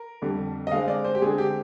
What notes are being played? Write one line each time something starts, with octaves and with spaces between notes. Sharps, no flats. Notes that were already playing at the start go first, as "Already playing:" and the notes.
Already playing: A#4
F2 D3 G3
D#5
D3 G#3 C4 F5
D5
C5
G4
D3 G#3 C4 G#4
G4